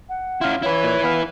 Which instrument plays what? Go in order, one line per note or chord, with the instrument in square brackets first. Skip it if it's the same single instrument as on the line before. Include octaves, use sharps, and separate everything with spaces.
[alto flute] F#5
[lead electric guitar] C#4 E4 [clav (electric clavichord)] F4 F5
[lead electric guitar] E4 B4 [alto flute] C#5
[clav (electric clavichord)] A#2
B3 F5